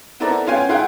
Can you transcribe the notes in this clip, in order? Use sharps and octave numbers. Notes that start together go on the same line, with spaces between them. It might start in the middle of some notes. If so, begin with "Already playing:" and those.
B3 C4 E4 A4 A#4 D5
B3 C#4 F4 G5 G#5
E4 F4 G#4 F#5 G5